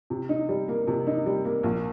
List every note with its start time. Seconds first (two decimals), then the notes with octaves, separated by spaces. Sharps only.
0.10 C3
0.29 D#4
0.49 G3
0.68 A#3
0.87 C3
1.07 D#4
1.26 G3
1.45 A#3
1.63 A#1